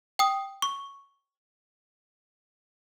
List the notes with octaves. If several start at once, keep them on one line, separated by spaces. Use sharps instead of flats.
G5 D#6
C#6